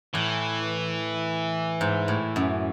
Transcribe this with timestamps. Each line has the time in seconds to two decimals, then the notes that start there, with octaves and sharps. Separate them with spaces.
0.14 A2 E3
1.81 G#2
2.08 A2
2.36 F#2